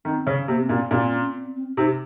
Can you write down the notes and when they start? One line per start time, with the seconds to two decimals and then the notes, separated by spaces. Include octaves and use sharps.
0.05 D#3 C4
0.27 C#3
0.48 C3 A#3
0.60 C4
0.69 A#2
0.73 A#3
0.91 A#2 C4
1.03 C4
1.12 C#4
1.35 C4
1.56 C4
1.77 C3 D#4